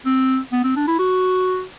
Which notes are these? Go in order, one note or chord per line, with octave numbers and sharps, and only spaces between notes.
C4
B3
C4
D4
E4
F#4